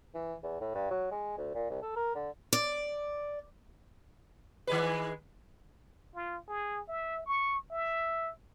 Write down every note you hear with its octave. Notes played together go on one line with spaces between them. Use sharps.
E3
E2
A2
G2
F#3
G#3
D2
A#2
C2
A4
A#4
D3
D5
D#3 G#3 B4
F4
G#4
E5
C#6
E5